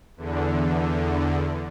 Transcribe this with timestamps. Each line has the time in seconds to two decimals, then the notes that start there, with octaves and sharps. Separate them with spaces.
0.17 E2 D3